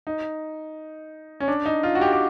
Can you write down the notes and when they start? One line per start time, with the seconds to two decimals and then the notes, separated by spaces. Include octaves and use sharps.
0.07 D#4
1.40 C#4
1.48 D4
1.66 D#4
1.83 F4
1.95 F#4
2.01 G4
2.13 G4